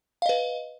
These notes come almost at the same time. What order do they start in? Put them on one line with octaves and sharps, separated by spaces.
F5 D#5 B4